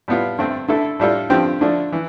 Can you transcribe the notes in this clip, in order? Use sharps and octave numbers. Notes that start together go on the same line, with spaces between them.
A2 G3 B3 F4
G2 D3 A3 C4
D3 A3 E4 A4
A2 G3 D4 F4 A4
G2 D3 F3 C4 G4
D3 F3 A3 D4
E3